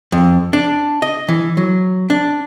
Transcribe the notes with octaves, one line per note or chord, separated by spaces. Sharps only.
F2
D4
D#5
E3
F#3
D4